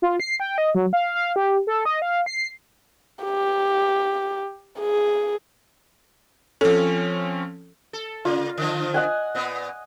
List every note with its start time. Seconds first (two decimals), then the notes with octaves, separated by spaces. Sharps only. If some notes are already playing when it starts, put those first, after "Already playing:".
0.02 F4
0.20 C7
0.40 G5
0.58 D#5
0.75 F#3
0.93 F5
1.15 F5
1.36 G4
1.67 A4
1.85 D#5
2.02 F5
2.26 C7
3.24 G4
4.80 G#4
6.61 F3 C4 C#4 A4
7.93 A4
8.25 C#3 A#3 F4
8.58 D3 D#3 F3
8.94 D#5 F#5 G#5
9.35 A#2 B3